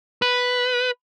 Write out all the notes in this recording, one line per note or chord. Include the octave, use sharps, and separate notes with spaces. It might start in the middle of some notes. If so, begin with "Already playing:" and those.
B4